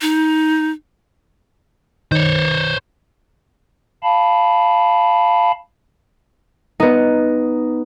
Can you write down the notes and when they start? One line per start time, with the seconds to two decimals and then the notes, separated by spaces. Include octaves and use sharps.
0.02 D#4
2.12 D#3 C5 C#5
4.03 F5 A5 B5
6.80 B3 D#4